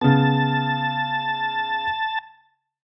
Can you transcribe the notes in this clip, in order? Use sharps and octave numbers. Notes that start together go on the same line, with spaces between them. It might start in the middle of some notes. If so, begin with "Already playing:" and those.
C#3 B3 A5